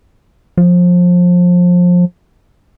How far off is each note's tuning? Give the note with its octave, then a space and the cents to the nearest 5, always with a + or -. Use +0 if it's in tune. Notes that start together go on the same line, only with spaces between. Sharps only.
F3 +25